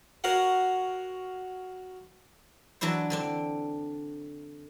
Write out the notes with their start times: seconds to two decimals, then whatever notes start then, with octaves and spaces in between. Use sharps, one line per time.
0.24 F#4 A#4 C#5 F5 F#5
2.81 E3 F#3 D4 E4 C5
3.10 D3 C4 D4